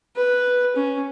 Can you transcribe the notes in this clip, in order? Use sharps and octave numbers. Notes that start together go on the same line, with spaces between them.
B4
C#4